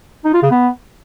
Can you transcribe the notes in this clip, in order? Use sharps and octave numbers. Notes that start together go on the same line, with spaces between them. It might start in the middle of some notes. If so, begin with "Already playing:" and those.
D#4
F4
C#3
B3